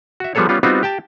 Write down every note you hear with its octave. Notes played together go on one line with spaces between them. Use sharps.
F#4 E5
F3 G3 B3 G#4 A4 C#5
G3 B3 C#4 F4
G3 B3 C4 D#4 F4 F#4
G4 G5 A5